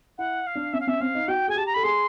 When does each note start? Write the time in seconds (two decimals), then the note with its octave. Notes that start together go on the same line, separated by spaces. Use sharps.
0.18 E4 F#5
0.47 F5
0.55 D4
0.73 C#4 E5
0.80 F5
0.87 C#4 E5
1.01 C4 F5
1.15 D#4
1.28 F#4 G5
1.48 G#4 G#5
1.55 G4 A5
1.66 A#5
1.74 A4 B5
1.83 G#4 C6